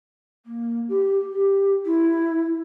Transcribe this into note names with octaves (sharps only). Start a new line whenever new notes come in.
A#3
G4
G4
E4